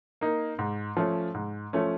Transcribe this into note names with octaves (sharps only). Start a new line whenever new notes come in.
A#3 D#4
G#2
F3 A3 C#4
G#2
F3 A3 C#4